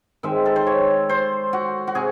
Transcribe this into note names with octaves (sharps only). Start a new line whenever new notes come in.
D#3 G#3 C4 E5
A4
C5
C#5
C5
F#4
F#4
C3 G#4